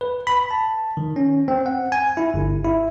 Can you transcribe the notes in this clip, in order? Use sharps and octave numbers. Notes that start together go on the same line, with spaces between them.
B4
B5
A5
D#3
C#4
C4
F#5
G#5
E4
G1
E4